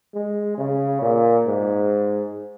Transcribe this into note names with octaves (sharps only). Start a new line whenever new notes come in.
G#3
C#3
A#2
G#2